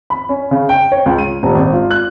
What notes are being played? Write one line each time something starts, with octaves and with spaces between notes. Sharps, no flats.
B5
C#4
C#3
G5
C#5
C#2
D#7
D#1
G#1
F4
F#6